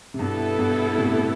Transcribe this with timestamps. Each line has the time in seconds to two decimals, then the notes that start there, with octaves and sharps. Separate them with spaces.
0.14 C3
0.19 G2 B2 B3 E4 A4
0.58 G2 B2
0.98 A2 C3